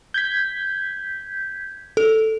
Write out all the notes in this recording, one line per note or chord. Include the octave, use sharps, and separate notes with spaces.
G6 G#6 B6
A4